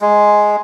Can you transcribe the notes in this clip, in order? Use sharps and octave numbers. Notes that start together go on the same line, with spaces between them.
G#3